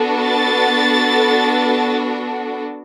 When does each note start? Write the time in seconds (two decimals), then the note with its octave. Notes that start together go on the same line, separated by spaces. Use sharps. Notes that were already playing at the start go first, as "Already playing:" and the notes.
Already playing: B3 D4 F#4 A4
0.21 A6